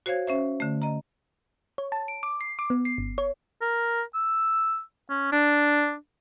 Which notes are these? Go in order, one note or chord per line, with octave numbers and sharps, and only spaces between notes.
F#4 C5 C#5 F5 G#6
C#4 C5 E5
D3 A3
D#5 A#5
C#5
A5
D7
D6
C7
D6
B3
C7
G1
C#5
A#4
E6
C#4
D4